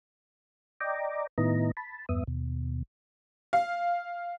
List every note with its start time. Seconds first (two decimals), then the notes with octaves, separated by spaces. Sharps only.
0.81 D5 D#5 G5 A#5 D6
1.38 A2 D#3 B3 E4 D#5 A#5
1.77 A5 B5
2.09 E2 G2 B3 E5 D#6
2.27 D#2 B2
3.53 F5